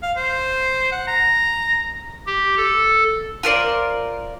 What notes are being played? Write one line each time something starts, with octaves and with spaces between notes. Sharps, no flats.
F5
C5
F#5
A#5
G4
A4
F4 A#4 C5 D5